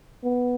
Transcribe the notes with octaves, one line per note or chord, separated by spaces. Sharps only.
B3